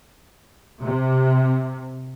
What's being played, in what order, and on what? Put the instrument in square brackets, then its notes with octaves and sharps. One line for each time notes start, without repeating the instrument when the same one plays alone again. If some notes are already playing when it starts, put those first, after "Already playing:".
[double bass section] C3